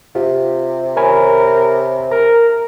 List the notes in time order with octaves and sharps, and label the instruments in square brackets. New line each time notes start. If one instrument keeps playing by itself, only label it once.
[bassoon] C3 [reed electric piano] F4 G4
[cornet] A#4 [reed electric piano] C#5 G#5 B5
[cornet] A#4 [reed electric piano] A#5